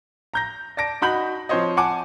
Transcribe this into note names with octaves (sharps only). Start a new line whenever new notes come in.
A#5 G6 A#6
D5 A5 A#6 D7
D#4 F#4 B5 G6 F#7
F3 C4 C5 C#5 D#5
F#5 G#5 A5 D6